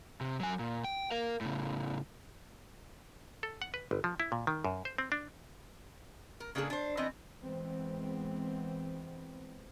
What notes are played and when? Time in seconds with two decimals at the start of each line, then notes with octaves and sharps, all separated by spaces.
0.21 C3
0.40 F#3 G#5
0.59 A#2
0.84 G5
1.11 A#4 F5
1.41 A2 C#3
3.43 A4
3.62 F#5
3.74 B4
3.91 G1
4.04 F3
4.20 E4
4.32 A#2
4.47 D#3
4.65 F#2
4.85 C5
4.98 C4
5.12 D4
6.40 A#4
6.55 C#3 A#3 D4 F#4 G#4 A4
6.70 D4 C5
6.97 E3 B3 C4 D#5
7.40 E3 G#3 B3 C4